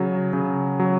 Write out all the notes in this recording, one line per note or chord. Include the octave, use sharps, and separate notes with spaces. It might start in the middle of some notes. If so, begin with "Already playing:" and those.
Already playing: C#3 F#3
C#3
F#3